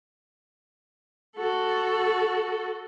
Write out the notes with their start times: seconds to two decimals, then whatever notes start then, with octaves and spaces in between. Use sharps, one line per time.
1.36 F#4 A4